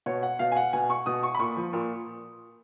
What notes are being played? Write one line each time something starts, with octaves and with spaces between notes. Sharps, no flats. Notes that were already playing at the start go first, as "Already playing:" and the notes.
B2 C#5
F#5
B2 F5
G#5
F#5
B2 G#5
C#6
B2 D#6
C#6
B5
A#2 C#6
F3
A#2